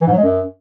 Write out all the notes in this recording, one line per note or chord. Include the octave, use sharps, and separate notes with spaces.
E3
G#2
F#3
G#3
F#2